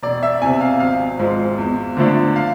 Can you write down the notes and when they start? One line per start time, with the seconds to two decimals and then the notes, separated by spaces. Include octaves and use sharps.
0.03 E1 D5
0.23 E5
0.42 E2 C3 G#5
0.61 F5
0.80 G#1 F5
1.19 G#2 F3 G#3
1.58 E2
1.97 D3 F3 A3 D4
2.36 F5